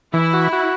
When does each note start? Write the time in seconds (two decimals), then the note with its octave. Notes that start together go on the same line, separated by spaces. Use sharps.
0.14 E3 E4
0.33 F#4
0.53 F#4